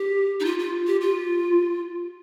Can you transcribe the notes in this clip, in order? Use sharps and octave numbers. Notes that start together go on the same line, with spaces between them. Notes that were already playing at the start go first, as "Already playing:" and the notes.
Already playing: G4
D#4
F4
F4
G4
F4